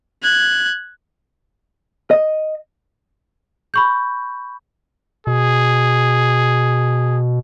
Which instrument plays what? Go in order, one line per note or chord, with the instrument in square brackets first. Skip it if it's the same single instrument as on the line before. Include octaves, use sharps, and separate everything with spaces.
[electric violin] F#6 G#6
[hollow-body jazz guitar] D#5
[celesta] B5 C#6 G6
[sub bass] B2 [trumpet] G#4